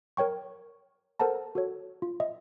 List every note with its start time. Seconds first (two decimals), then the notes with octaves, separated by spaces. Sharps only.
0.17 A#4 C#5 G5 C#6
1.20 A4 A#4 C5 F#5 A5 A#5
1.55 F#4 A4 C#5
2.02 F4
2.20 D#5 E5